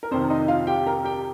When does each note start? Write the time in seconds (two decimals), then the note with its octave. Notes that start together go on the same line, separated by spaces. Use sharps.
0.03 A#4
0.11 F2 C3 D#3 C5
0.30 D#4 D#5
0.48 F4 F5
0.67 G4 G5
0.86 A#4 A#5
1.04 G4 G5